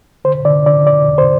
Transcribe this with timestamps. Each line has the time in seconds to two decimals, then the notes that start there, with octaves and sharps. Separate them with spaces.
0.25 D3 C5
0.45 D3 D5
0.66 D3 D5
0.87 D3 D5
1.07 E2
1.18 C5